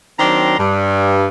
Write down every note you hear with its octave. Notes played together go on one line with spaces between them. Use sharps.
D#3 F#3 C4 D4 A#5 C6
G2